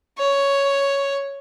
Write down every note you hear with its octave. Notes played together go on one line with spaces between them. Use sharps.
C#5